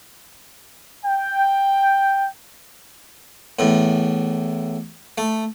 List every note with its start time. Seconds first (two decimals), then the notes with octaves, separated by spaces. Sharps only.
1.05 G5
3.59 E2 A2
5.18 A3